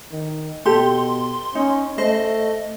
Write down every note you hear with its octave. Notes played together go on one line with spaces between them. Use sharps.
D#3
B2 G4 A4 C6
C#4 D#4
A3 C5 D#5